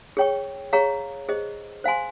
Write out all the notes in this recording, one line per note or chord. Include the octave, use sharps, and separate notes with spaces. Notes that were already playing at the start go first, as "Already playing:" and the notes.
G#4 C#5 G5 C#6
G#4 C#5 F5 A#5 C#6
G#4 C5 D#5
C5 F5 G#5 C6